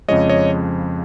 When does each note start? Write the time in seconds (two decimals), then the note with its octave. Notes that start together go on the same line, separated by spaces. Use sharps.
0.08 F2 C#3 F3 G#3 C#5 D#5
0.29 C#5 D#5